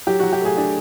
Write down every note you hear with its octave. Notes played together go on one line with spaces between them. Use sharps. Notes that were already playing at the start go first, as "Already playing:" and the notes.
F#3 G4
F#3 F#4
G4
A3 G#4
D4 G#4